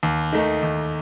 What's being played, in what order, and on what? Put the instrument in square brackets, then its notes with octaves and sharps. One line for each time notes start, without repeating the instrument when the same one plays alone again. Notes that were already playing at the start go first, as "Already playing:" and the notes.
[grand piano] D#2
D#3 A3 D#4
D#2